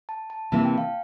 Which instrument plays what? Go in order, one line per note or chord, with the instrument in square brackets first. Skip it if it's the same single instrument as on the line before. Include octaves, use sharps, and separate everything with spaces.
[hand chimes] A5
A5
[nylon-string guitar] C3 E3 A#3 E4 [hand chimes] A5
[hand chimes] G5
F5